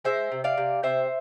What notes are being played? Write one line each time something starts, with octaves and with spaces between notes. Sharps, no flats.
G#3 C5 E5
C3
D5 F5
C3
C3 C5 E5